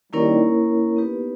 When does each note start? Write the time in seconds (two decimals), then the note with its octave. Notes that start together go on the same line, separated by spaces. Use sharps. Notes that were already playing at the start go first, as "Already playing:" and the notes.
0.13 D#3 G3 A#3 C#4 E4 A#4 C#5
0.96 B3 D#4 G4 B4